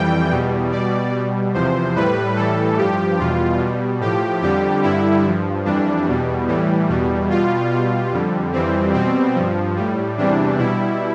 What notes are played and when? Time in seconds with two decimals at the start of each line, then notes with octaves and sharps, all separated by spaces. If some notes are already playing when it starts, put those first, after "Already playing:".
Already playing: F2 E3 G3 G5
0.31 E2 B2 G3
0.72 B2 G3 D5
1.13 B2 G3
1.54 E2 C3 F3 C5
1.96 A2 G3 B4
2.36 A2 E3 G3 A4
2.77 G2 F3 G4
3.18 E2 B2 G3 F4
3.59 B2 G3
4.01 A2 F3 G4
4.42 F2 D3 G3 G4
4.83 G2 D3 G3 E4
5.24 G2 F3
5.65 F2 E3 G3 D4
6.06 E2 B2 G3
6.48 A2 E3 G3
6.88 E2 B2 G3
7.30 B2 G3 F4
7.70 B2 G3 F4
8.12 F2 D3 G3
8.53 F2 E3 G3 C4
8.94 B2 G3 C4
9.35 G2 F3
9.76 A2 G3
10.18 E2 C3 E3 G3 D4
10.58 B2 G3 E4